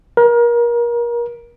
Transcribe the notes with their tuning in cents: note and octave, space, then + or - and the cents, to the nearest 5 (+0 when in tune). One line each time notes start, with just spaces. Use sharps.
A#4 +30